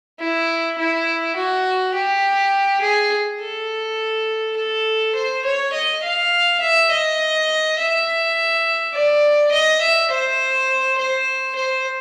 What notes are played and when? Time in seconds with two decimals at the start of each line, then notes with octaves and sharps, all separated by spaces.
0.20 E4
0.78 E4
1.36 F#4
1.94 G4
2.82 G#4
3.40 A4
4.57 A4
5.15 C5
5.44 C#5
5.73 D#5
6.03 F5
6.60 E5
6.91 D#5
7.78 E5
8.94 D5
9.52 D#5
9.81 E5
10.11 C5
10.98 C5
11.56 C5